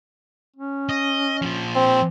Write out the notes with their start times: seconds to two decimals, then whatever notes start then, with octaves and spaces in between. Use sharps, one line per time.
0.56 C#4
0.89 D#5
1.42 A#2 F3
1.75 C4